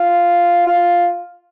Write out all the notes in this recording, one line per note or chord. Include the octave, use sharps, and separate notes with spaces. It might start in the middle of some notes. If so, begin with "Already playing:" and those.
Already playing: F4
F4